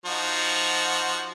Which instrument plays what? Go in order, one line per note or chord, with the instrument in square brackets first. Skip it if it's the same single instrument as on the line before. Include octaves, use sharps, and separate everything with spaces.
[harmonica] F3 D#4 F#4